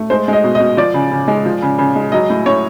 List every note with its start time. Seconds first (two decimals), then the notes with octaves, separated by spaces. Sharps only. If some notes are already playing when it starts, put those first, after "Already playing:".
Already playing: A3
0.10 G#3 C5
0.28 G#3 D#5
0.44 B2
0.55 D#5
0.60 B2
0.77 F3 D5
0.94 C#3
1.12 C#3
1.28 G#3
1.46 F3
1.62 C#3
1.78 C#3
1.96 G#3
2.12 F#3 D#5
2.30 A2
2.46 A2 C#5